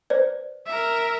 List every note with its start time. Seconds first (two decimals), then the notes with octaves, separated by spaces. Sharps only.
0.10 B4 C5 D5
0.67 A#4 E5